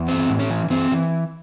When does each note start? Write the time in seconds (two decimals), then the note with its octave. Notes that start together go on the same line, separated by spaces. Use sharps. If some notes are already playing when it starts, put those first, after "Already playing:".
Already playing: E2
0.08 E3 C4
0.29 A2
0.39 C#4
0.50 E3
0.70 E3 C4
0.91 E3